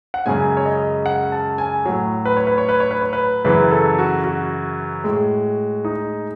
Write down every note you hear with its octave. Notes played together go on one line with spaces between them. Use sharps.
F#5
F#2 C#3 G#3 G#5
C#5
D#5
F#5
A5
G#5
A2 F#3
B4
C#5
B4
C#5
B4
C#5
B4
C#5
B4
F#2 C#3 E3 B4
A4
F#4
F#4
A2 G#3
D#4